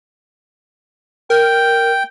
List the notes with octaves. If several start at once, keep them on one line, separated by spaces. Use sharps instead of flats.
A#4 G5